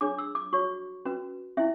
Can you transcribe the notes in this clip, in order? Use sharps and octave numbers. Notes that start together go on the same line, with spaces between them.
D4 G#4 C#5 D6
E6
D6
F#4 C#5 C#6
C#4 F#4 B4
C#4 E4 E5